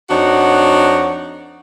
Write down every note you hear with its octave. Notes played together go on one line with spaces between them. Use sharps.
F2 D4 D#4 F#4 C#5 F#5